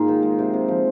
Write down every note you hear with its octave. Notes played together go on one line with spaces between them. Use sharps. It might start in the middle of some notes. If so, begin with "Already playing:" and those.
Already playing: G#2 A#3 D#4 F4 G#4
D#3
G#3
C3
C3
F3